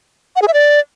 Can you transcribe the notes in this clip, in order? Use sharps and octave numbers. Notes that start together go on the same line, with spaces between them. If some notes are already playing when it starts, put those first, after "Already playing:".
F#5
G#4
E5
D5